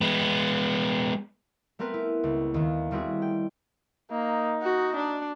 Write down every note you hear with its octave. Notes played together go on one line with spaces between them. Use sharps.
G#3 B3
A3 B3 C4 A#4 B4
E4
C#2
D#2 D#3
D#3 G3 C4 E4 F#4 G#4
G5
A#3 D#4
F#4
D4